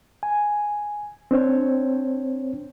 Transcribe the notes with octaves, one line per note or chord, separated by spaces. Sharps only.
G#5
C4 D4 C5 C#5